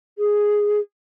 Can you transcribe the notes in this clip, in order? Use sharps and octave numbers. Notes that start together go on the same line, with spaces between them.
G#4